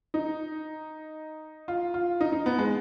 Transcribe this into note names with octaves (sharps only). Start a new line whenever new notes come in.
D#4
F4
F4
D#4
D#4
B3
G#3